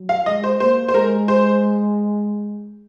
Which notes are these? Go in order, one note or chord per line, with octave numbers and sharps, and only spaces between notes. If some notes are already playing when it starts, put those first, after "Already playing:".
Already playing: F#3
F5
G#3 D#5
C5
A#3 C5
C5
G#3 A#4
C5